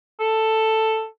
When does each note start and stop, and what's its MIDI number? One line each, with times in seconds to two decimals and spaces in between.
0.20 1.05 69